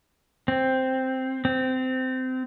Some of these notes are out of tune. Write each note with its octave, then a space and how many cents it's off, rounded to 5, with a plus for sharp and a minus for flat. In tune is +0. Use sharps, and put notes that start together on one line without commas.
C4 +0
C4 -20